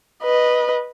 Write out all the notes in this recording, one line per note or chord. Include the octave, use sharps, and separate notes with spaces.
B4 D#5